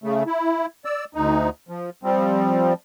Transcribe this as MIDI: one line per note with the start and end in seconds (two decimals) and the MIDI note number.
0.04 0.23 49
0.04 0.23 57
0.27 0.66 64
0.85 1.05 74
0.85 1.05 88
1.15 1.49 38
1.15 1.49 63
1.69 1.90 53
2.03 2.73 53
2.03 2.73 55
2.03 2.73 60